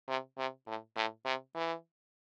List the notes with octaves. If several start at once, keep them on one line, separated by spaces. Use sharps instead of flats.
C3
C3
A2
A2
C3
E3